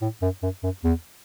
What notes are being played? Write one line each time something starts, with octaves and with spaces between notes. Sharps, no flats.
A2
F#2
F#2
F#2
E2